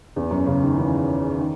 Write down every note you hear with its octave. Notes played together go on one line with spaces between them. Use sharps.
E2
F#2
C#3
D#3
E3
D#3